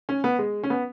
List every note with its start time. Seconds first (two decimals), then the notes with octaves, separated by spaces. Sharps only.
0.09 C#4
0.24 B3
0.39 G#3
0.63 C#4
0.70 B3